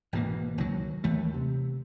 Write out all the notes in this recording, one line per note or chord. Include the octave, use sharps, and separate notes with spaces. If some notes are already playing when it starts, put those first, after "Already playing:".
G#1 B2 E3 A#3
C#2 D#3 F#3
D#2 E3 A3
C3